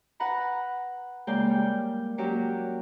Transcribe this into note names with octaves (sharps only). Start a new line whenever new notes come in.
B4 F#5 A#5 B5
C#3 G#3 A#3 D5 G5 G6
G3
F#3 A#3 C#4 F#4 G4